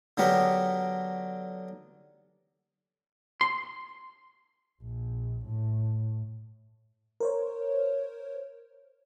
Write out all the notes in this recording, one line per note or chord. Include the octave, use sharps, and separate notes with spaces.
D3 F#3 B3 G4 A#4 B5
C6
A#1
A2
A#4 C5 C#5